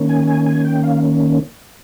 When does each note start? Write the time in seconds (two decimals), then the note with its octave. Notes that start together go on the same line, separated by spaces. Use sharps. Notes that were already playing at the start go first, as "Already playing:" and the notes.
Already playing: D#3 A#3 C#4
0.09 G#5
0.27 G#5
0.46 G#5
0.65 G5
0.83 F5